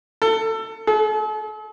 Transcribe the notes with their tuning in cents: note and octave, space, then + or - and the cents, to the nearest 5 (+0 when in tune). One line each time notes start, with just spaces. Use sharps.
A4 +25
A4 -45